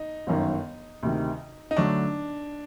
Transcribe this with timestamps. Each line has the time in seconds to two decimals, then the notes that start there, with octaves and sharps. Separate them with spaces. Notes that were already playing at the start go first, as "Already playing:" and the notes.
Already playing: D#4
0.27 G1 F#2 D#3
1.03 D2 C3 D#3
1.71 D#4
1.77 D3 F#3 A3 D4